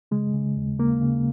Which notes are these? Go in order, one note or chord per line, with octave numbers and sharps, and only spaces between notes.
C#3 G#3
C#3
D#2
C#3 A#3
C#3